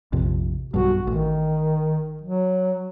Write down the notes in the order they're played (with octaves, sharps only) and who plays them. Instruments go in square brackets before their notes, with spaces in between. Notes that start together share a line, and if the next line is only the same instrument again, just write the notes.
[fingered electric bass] A#1 F2 C3
[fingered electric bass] B1 G2 [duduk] F#4
[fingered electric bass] A1 [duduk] D#3
[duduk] F#3